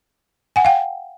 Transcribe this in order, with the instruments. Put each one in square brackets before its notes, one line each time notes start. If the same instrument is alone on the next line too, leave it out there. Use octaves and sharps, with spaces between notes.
[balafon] F#5 G#5
F5 G5